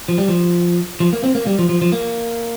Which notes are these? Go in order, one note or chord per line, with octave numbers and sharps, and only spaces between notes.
F3
G3
F3
F3
A#3
C4
A#3
G3
F3
F3
F3
A#3